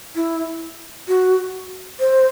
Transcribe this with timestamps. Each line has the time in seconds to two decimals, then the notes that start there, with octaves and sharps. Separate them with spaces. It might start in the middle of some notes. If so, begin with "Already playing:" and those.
0.15 E4
1.08 F#4
2.00 C5